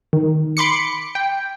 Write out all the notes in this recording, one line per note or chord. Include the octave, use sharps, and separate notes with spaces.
D#3
B5 C6 D6 C#7
G5